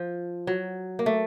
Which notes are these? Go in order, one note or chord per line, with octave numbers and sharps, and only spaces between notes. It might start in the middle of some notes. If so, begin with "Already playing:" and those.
Already playing: F3
F#3
A#3
A3